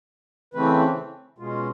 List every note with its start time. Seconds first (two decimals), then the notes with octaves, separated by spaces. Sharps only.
0.54 C#3 E3 A3 C4 B4
1.38 B2 G#3 C#4 F4